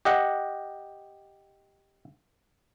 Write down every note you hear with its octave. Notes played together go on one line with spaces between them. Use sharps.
G4 D#5 F#5